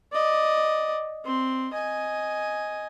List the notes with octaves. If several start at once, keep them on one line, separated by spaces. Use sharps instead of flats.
D5 D#5
C4 C6
D#5 G#5